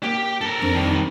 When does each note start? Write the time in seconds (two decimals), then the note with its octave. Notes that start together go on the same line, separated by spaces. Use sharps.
0.03 A#3 G4 C#5 G5
0.41 D4 A4 A#4
0.62 F2 C4 D4
0.74 D#3 G3